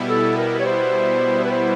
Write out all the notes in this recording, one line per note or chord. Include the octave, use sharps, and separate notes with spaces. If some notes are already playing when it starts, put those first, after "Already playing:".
Already playing: B2 G3 B3 E4
A4
A#4
C#5
C5
B4
C5